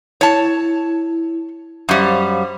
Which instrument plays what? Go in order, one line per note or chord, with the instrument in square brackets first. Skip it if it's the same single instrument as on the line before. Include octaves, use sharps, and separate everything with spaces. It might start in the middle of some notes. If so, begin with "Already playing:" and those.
[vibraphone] E4 [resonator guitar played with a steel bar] C#5 A5
[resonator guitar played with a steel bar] F#2 G3 [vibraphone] C5 F5